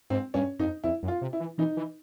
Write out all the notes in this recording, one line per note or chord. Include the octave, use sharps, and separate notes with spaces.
G#2 C4
G2 C#4
F2 D#4
F2 E4
F#2
F4
C3
E4
E3
E3 D#4
E3